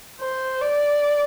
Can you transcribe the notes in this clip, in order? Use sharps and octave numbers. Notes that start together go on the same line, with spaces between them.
C5
D5